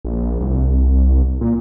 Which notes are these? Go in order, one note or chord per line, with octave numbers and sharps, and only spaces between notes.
A#1
C2
A#2